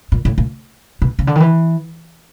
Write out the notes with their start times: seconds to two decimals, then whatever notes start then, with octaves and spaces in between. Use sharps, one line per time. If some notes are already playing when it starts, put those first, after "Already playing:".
0.12 A#2
0.25 A2
0.38 A#2
1.02 B2
1.19 C#3
1.27 D3
1.35 D#3
1.40 E3